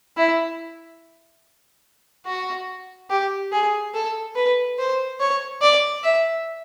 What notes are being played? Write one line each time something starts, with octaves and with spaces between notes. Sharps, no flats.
E4
F#4
G4
G#4
A4
B4
C5
C#5
D5
E5